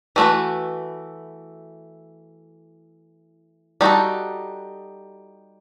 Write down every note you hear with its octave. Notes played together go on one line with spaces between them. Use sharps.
E3 A3 D#4 F#4 B4
G3 D#4 F#4 A4